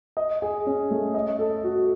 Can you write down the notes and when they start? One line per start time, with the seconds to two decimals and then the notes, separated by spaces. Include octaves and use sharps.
0.17 D#5
0.42 G#4
0.67 C#4
0.91 A3
1.14 D#5
1.39 A4
1.64 F#4